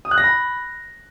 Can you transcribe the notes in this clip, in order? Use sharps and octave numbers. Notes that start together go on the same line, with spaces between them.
D#6
F#6
A#6
B5